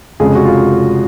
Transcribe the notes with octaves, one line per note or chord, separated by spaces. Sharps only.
F1 F2 C#3 G#3 G#4
F#4
F4